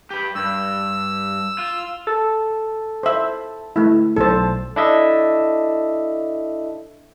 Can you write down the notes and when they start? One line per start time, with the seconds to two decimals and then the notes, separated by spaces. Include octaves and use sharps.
0.11 G4 B4
0.35 G2 E6
1.58 F4
2.07 A4
3.03 C5 E5
3.76 A3 E4
4.17 B1 A4 C5 A5
4.76 D4 E4 A4 D#5 E5